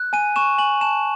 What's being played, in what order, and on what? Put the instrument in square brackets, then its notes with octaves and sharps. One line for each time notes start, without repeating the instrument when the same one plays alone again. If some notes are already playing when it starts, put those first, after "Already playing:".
Already playing: [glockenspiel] F#6
G#5 D#7
C#6 E7
G#5 F#7
A5 E7